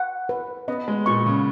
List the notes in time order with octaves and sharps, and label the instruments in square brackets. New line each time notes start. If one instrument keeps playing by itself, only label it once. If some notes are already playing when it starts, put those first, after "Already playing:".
Already playing: [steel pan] F#5
B4
[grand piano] B3 [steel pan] D#5
[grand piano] G#3
[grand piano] A#2 [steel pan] C#6
[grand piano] C#3